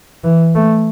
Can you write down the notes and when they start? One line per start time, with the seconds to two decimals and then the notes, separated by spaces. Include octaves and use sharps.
0.24 E3
0.55 A3